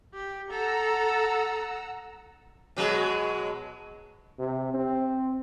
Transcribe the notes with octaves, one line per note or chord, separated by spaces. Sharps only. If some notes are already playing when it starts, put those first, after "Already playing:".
G4
A4 F#5 A#5 E6
B2 F#3 G#3
C3
C4